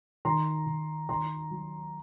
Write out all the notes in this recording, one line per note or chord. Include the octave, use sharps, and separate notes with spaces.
D#3 A#5 C6
D#3
D#3 A#5 C6
F#3